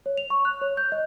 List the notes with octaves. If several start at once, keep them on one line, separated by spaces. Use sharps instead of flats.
C#5
F7
C#6
F#6
C#5
G6
D#5